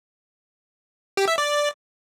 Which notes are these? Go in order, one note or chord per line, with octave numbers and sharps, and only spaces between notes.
G4
E5
D5